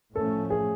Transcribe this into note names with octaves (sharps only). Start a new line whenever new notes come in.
A2 F3 A3 C#4 A4
G#4